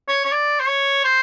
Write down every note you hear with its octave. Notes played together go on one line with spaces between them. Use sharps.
C#5
C#5
D5
C5
C#5
C5